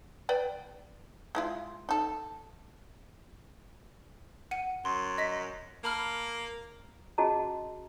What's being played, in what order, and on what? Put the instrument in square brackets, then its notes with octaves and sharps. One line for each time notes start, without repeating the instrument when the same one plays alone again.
[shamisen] B4 D5 G5
G#3 E4 F4
D#4 A4
[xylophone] F#5 D#7
[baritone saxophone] F#2 [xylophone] C6
[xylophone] D#5 B6
[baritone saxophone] A#3 [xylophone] A5 B5 F6
[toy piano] C#4 F#4 G#4 D#5 A5 A#5